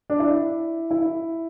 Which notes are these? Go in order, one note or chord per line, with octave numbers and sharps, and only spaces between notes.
D4
E4
E4